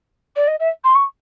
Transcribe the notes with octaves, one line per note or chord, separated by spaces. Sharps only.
D5
D#5
E5
C6
C#6